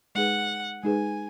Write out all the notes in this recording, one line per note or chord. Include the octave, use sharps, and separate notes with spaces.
G#3 D#4 G#4 B4 F#5
G#3 D#4 G#4 B4 G#5